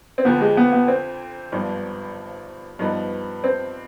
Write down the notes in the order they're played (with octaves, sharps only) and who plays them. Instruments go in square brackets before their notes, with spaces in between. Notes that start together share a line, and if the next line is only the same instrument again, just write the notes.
[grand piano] C4
[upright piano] F2 D3 F3 [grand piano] B3
[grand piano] G#3
B3
B3
C4
[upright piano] G#1 G2 F3 B3 D4
G2 F3 B3 D#4 B4
[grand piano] C4